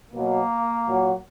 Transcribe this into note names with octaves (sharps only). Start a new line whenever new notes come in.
B2 F#3 A#3
A#2 F#3